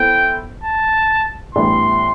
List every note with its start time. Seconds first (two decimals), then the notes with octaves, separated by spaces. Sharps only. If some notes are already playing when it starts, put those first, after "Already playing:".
Already playing: B3 E4 A4 C5 G5
0.64 A5
1.55 A2 E3 G3 B3 D4 C6